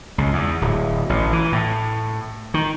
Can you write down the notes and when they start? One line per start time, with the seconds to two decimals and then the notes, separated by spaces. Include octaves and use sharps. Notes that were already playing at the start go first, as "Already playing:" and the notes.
0.18 C#2
0.33 E2
0.61 D1
1.09 A1
1.33 E3
1.52 A2
2.54 D#3